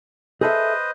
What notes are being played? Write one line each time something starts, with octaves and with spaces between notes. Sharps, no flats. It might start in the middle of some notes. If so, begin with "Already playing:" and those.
G#4 A4 B4 C5 D#5 E5